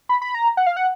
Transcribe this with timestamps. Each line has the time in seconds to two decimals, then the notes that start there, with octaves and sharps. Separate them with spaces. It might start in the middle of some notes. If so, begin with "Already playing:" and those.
0.09 B5
0.22 B5
0.35 A#5
0.57 F#5
0.66 F5
0.77 F#5